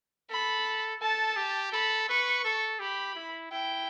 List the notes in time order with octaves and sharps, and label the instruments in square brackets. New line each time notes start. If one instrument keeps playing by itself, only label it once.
[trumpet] A4 [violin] B5
[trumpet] A4 [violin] A5
[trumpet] G4
[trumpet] A4 [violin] B5
[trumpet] B4 [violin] C#6
[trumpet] A4
[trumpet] G4 [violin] B5
[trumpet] E4
[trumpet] E4 [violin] G5